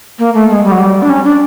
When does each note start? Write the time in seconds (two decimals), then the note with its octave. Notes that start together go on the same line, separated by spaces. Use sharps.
0.19 A#3
0.34 A3
0.50 G#3
0.64 G3
0.72 F#3
0.80 G3
1.02 D4
1.10 C#4
1.24 D4